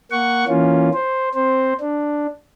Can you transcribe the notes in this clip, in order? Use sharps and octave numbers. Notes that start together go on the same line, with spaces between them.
A#3 F#5 C#6
E3 A#3 C#4 F4
C5
C4 C5
D4